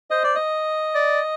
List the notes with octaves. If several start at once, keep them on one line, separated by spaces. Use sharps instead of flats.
C5 D#5
D5
D#5
D5